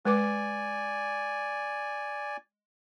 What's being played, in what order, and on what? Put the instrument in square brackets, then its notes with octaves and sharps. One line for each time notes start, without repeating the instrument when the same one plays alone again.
[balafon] G#3 B4 D6 [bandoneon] D5 G#5